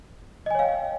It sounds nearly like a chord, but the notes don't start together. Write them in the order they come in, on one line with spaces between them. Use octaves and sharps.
D#5 G#5 C#5 F5 G5